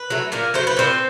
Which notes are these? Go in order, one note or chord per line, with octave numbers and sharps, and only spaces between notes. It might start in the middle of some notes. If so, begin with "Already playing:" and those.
Already playing: B4
F#3 A3
A#2 A#3 A#4
F#3 A3 C5
B4
A#2 C4 C5